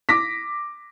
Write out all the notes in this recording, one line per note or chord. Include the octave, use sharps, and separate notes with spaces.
D6 A#6 B6